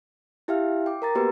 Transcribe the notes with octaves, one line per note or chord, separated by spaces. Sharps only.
E4 G4 E5 F5 G5 F6
G5 D6
A#4 A#5 A6
A#3 B3 F#4 G4 B4